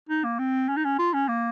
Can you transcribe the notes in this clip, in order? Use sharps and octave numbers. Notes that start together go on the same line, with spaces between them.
D#4
A#3
C4
C#4
D#4
C#4
F4
C#4
A#3